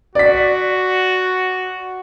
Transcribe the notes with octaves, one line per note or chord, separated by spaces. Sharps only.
F#4 D5 B6